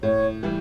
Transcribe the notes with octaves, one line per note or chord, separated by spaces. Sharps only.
A2 C#5
E3 G3